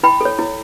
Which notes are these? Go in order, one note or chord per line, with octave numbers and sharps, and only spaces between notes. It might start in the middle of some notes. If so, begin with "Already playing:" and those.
E4 G5 B5
A4 C#5
E4